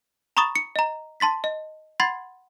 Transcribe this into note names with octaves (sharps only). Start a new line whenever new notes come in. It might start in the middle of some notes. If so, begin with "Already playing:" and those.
A#5 B5 C#6 D#6 A6 E7
C#7
D#5 A#5
A5 C6 A6 B6
D#5
F#5 B5 C6 G#6 A6 C7